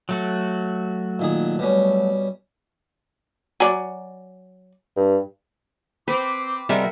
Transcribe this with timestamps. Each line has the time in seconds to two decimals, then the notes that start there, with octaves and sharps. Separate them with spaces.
0.09 F#3 A3 F#4
1.20 A#2 D#3 G#4
1.59 B2 G3 C#4
3.60 F#3 D5 G#5
4.97 G2
6.08 C4 B4 D6
6.69 C3 G3 G#3 F#4 A#4 E5